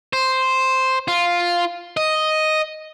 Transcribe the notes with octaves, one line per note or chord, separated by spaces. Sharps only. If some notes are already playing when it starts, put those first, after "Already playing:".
C5
F4
D#5